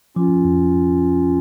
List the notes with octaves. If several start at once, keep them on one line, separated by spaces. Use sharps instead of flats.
F3 C#4 F4
F2